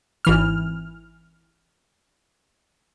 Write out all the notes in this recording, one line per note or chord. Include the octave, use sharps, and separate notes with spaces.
G#1 E3 F6